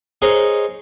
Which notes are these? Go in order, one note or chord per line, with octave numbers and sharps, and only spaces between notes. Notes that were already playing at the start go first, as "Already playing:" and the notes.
D#4 G#4 A#4 C5 C#5 D#5